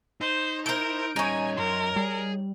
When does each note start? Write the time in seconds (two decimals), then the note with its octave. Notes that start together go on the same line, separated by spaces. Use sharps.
0.21 D#4 C5
0.66 E4 A#4 C5 G6 D7
1.16 G3 C#4 D#4 C#5 G#5
1.57 F#2 A#4 C6
1.96 G3 G#4